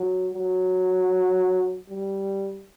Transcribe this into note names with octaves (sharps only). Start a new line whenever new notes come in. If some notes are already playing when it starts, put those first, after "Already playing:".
Already playing: F#3
F#3
G3